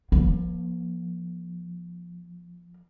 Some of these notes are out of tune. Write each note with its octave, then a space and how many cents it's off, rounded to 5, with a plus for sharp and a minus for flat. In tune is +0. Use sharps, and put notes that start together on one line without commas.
F3 +0 A#3 +40